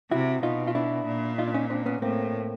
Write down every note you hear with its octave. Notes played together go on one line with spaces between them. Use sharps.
C3 E4 F#4
B2 D#4 F4
F4
D4 E4
A#2
D#4 F4
D4
C#4 D#4
C4 D4
B3 C#4
A2 A#3 C4